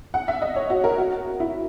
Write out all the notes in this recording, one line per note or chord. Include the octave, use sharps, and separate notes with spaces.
F#5
E5
D#5
C#5
F#4
A#4
F#4
E4